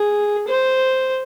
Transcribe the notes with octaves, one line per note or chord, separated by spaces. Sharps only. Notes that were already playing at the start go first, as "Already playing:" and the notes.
Already playing: G#4
C5